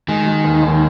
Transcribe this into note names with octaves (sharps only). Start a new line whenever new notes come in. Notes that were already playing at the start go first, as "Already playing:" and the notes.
D#3 G#3
G#3
D#2
D#2